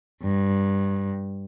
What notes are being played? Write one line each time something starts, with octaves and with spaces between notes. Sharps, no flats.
G2